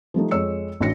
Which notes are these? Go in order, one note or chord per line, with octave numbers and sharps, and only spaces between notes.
F3 G3 A3 D#4
F2 G#3 C#5 E6 C#7
A1 D4 F#4 A#6 C#7